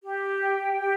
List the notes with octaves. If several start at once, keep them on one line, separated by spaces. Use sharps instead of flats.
G4
G5
G4